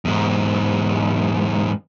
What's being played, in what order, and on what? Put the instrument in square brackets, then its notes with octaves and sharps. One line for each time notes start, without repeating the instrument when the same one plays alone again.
[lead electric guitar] E2 G#2